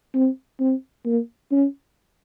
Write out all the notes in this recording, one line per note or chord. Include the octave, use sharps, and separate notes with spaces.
C4
C4
A#3
C#4